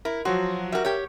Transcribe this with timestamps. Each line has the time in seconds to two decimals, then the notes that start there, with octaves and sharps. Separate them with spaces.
0.05 E4 A#4
0.25 F3 F#3 F#4 C6
0.72 G3 F#4 A#4 E5
0.85 G4 C#5